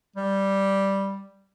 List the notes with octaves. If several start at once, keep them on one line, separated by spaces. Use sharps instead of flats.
G3